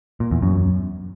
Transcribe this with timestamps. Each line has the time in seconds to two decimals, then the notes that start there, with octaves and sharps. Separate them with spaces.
0.20 A#2
0.31 E2
0.42 F#2